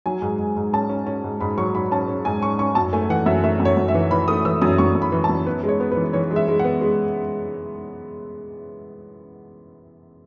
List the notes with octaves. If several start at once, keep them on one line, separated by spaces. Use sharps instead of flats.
F#3 G#5
G#2
G#2
G#2
C#4 A5
C#4
C#4
G#2
G#2 B5
F#3 C#6
F#3 B5
C#4 A5
C#4
G#2 G#5
C#4 C#6
C#4 C#6
F#2 A5
A3 G#5
E3 F#5
F#2 E5
A3 E5
F#2
C#5
F#2
E5
E3
E3 B5
A3 D#6
E3 E6
F#2 D#6
F#2 C#6
F#2
B5
E3
A5
F#2
B3 B4
G#3
C#5
B3
B4
E3
E3 C#5
G#3
E5
G#3
F#5
B3
G#3